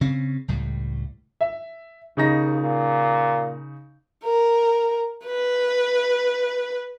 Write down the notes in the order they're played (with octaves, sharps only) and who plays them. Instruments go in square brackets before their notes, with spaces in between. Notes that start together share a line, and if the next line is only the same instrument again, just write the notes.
[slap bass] C#3 C4 C#4
C#2 A2 G3
[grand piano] E5
[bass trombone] D#2 [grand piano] C#3 D#4 A#6
[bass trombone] A#2
[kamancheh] A#4
B4